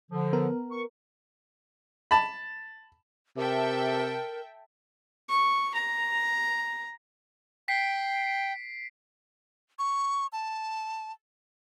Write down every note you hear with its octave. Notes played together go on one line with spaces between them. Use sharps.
D3 F3
B3 A#4
C#6
A5 B5
C3 A4 A#4 E5 G5
C#6
A#5
G5 B6 C7 D7
C#6
A5